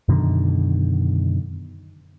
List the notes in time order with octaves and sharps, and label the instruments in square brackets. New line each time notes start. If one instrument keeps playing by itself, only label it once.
[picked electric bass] F#2 B2 D3 D#3